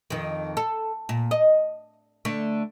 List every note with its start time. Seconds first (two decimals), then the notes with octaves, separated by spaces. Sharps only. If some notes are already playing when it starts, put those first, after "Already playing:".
0.10 F2 D#3
0.57 A4
1.09 A#2
1.31 D#5
2.25 D3 A3